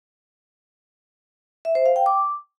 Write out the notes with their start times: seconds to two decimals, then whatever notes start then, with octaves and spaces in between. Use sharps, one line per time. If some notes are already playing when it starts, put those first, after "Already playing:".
1.65 E5
1.75 C5
1.86 F5
1.96 G5
2.06 D6